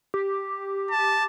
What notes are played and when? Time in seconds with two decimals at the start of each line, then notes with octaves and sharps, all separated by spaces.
0.14 G4
0.91 A5